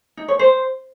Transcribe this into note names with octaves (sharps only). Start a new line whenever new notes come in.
D#4
C#5
C5